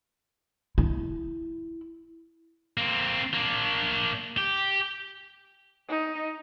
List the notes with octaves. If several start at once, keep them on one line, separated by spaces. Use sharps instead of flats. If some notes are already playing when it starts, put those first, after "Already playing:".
E4
A#3 C4
A#3 D4
G4
D#4